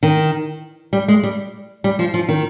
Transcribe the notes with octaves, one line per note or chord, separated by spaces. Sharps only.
D#3
G3
G#3
G3
G3
F3
F3
D#3